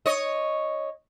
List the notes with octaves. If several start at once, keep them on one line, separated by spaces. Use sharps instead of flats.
C#5 D#5